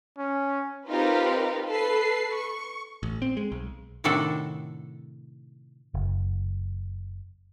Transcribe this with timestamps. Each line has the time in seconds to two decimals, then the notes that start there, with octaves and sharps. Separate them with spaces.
0.18 C#4
0.88 C4 D#4 F4 G4 A#4 B4
1.67 A4 B4 C7
2.35 C#6
3.03 A1
3.22 C4
3.37 G#3
3.52 B1
4.04 A2 C3 D#3 D4 F#4 A4
5.94 F#1